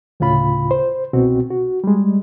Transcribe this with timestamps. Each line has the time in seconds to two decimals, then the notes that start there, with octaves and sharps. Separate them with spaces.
0.20 D2 A2 C#3 F4 B5
0.71 C5
1.13 C2 B2 C4 F#4
1.50 F#4
1.84 G3 G#3